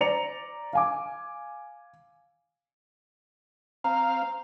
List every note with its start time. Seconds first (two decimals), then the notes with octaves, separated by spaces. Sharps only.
0.01 C5 D5 A#5 C#7 F7
0.73 F5 G#5 D6
3.84 C4 F5 A#5